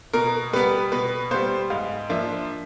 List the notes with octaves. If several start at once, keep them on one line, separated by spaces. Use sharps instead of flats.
B2 A#4
G3 B3 B4
B2 B4
G3 B3 C5
G#2 F5
F3 A#3 D4 E5